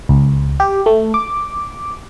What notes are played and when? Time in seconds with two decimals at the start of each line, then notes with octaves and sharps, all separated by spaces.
0.09 C#2
0.60 G4
0.86 A3
1.14 D6